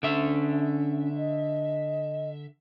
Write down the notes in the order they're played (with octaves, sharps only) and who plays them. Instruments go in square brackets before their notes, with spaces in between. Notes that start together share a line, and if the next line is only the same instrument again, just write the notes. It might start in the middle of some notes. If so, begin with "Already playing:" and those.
[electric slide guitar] D3 E5 [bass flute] C#4
[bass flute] D#5